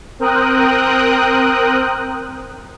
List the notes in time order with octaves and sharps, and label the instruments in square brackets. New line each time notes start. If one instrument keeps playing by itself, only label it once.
[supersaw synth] C4 A#4 G5 D#6 F#6